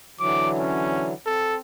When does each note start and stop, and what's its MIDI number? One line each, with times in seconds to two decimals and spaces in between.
0.20 1.13 50
0.20 1.13 52
0.20 1.13 54
0.20 0.49 86
0.59 1.09 61
1.26 1.60 60
1.26 1.57 69